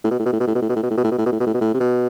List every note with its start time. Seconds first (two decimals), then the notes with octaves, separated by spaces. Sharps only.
0.04 A2
0.11 B2
0.19 A2
0.26 B2
0.33 A2
0.40 B2
0.47 A2
0.55 B2
0.62 A2
0.69 B2
0.76 A2
0.83 B2
0.90 A2
0.97 B2
1.04 A2
1.12 B2
1.18 A2
1.26 B2
1.32 A2
1.40 B2
1.47 A2
1.54 B2
1.61 A2
1.74 C3
1.80 B2